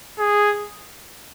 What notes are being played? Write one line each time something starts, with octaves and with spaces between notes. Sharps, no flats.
G#4